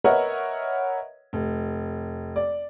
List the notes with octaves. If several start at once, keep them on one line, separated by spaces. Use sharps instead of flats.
A#4 B4 C#5 D#5 E5 F#5
F1
D5